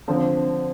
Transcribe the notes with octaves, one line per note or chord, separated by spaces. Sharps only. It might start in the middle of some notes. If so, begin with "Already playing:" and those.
D3 F3 C4